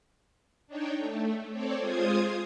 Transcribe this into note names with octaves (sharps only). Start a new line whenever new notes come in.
D4 D#4 C#5 G5
A3
C4 A4 C#5 D5
G#3 F4 C5 D#6 G#6